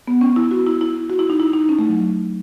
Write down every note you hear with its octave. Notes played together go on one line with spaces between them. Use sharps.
B3
C#4
E4
F#4
E4
E4
F#4
E4
D#4
E4
D#4
C#4
A3
F#3